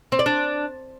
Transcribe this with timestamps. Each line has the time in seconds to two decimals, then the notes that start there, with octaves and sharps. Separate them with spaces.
0.12 C4
0.19 D5
0.26 D4